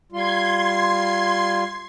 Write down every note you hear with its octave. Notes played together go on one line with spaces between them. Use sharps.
G3 F4 C6 G#6